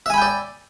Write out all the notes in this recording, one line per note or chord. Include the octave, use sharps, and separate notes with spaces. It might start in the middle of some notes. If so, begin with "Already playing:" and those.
D5 E5 G5 G#5 B5